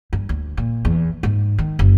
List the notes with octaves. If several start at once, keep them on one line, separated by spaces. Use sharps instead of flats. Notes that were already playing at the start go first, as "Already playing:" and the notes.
G2
D2
A#2
E2
G#2
D#3
F#1